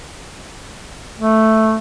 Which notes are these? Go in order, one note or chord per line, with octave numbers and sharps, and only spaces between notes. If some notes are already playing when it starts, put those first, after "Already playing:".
A3